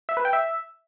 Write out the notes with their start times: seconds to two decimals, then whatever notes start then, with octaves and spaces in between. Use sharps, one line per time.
0.09 E5
0.17 B4
0.25 G5
0.33 E5